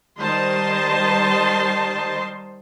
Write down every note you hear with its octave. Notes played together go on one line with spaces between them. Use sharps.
D#3 G3 C5 D#5 A5 C6